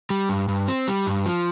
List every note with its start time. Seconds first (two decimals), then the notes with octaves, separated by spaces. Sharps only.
0.10 G3
0.29 G2
0.48 G2
0.68 C4
0.88 G3
1.07 G2
1.26 F3